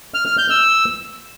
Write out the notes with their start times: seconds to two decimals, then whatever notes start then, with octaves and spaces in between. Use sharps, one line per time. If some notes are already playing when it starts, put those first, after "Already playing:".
0.14 F6
0.26 F6
0.38 G6
0.50 E6